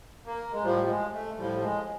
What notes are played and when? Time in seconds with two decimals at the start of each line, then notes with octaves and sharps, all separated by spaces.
0.26 A#3
0.52 G#3
0.63 A2 F3 G3
0.88 G#3
1.13 A3
1.37 A2 F3 G3
1.62 G#3